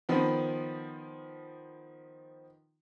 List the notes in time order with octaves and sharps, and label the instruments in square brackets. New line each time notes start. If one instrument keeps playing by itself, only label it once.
[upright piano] D#3 F3 B3